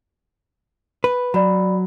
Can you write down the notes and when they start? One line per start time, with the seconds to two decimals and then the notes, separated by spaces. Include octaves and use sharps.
1.04 B4
1.34 F#3 D5 B5